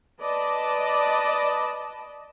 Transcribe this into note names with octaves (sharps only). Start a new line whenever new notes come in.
B4 D5 D#5 A5